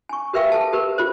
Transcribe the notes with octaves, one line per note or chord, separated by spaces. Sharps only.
G#5 C#6
G4 A#4 B4 E5 F5 G5
A4 A5
G4 A#4 B4
F4 C5